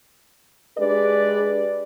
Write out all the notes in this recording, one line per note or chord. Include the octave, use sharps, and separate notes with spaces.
G#3 D4 G4 G#4 B4 D5